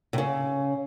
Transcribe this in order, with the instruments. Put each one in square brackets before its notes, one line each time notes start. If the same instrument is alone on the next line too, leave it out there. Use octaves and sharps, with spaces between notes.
[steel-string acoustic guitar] C3
C#3